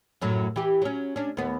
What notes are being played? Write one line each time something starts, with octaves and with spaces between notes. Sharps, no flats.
F#2 A2 F#3
E3 G4
F#3 C#4
C#4 D4
D#2 B3